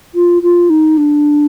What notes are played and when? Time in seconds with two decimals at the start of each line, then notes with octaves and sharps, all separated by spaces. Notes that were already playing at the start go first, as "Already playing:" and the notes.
0.15 F4
0.43 F4
0.70 D#4
0.97 D4